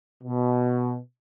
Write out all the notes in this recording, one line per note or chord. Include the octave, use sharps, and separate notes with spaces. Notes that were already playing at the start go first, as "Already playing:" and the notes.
B2